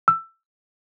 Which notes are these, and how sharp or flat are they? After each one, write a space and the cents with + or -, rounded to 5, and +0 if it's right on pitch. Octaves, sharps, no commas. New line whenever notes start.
E6 +15